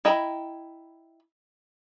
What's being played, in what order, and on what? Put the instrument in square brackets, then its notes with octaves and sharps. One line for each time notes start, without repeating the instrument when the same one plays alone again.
[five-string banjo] E4 D#5 G5 A#5 B5